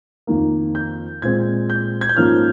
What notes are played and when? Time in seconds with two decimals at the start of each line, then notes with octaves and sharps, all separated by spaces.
0.27 F2 D#3 A#3
0.75 G6
1.22 A#2 G#3 C4 G#6
1.70 G6
2.01 G#6
2.09 G6
2.17 G#2 F3 A#3 C#4 F6